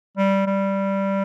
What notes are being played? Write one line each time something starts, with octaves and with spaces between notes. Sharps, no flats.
G3
G3